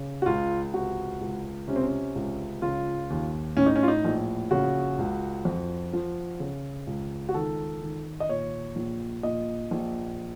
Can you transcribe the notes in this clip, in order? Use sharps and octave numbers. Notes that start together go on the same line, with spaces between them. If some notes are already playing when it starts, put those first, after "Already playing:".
Already playing: C#3
F#4
C#2 F4
C3 F#4
C#2
C3 C#4
C4
C#4
C#2
C#3 F4
D#2
A2 C#4
D#4
C#4
F4
D#4
A#1
C#3 F#4
C#2
F2
F3
C#3
C#2
F#4
D#3 A4
D#3
D#5
A#2 C#5
A#1
A#2 D#5
A#1